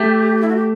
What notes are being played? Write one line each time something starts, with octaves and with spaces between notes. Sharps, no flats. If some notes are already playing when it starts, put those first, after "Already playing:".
Already playing: A3 G4
E4
F#4
G4